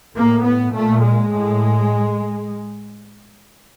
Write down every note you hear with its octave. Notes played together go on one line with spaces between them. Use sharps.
A2 A#3
B3
A#2 A3
G#3
A2